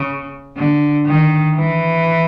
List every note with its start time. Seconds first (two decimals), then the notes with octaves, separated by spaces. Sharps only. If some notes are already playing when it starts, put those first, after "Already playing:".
Already playing: C#3
0.57 D3
1.06 D#3
1.56 E3